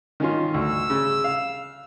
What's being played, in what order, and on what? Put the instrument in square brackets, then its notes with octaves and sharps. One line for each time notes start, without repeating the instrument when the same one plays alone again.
[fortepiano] D#3 C#4 F4
[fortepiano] D2 [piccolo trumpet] E6
[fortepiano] C#3
F5